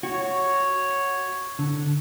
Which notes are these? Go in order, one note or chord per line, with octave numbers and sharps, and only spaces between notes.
F#4 C#5
D3